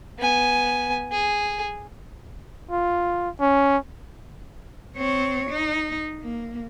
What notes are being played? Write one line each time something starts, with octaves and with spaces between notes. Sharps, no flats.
B3 G#5
G#4
F4
C#4
C4 C#5
D#4
A#3